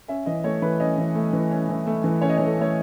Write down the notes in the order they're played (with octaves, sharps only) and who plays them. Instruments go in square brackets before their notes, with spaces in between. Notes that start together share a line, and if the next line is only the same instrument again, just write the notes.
[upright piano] C#4 E5
E3 D#5
A3 C#5
E3 B4
C#4 D#5
E3
A3
E3
C#4
E3
A3
E3
C#4 C#5
D#5
E3 C#5
A4
A3 C#5